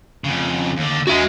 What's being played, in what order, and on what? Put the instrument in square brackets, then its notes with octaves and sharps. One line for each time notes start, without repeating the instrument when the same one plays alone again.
[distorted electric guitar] F2 C#3
D#2 D3
[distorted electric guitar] G#3 [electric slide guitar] F#4 E5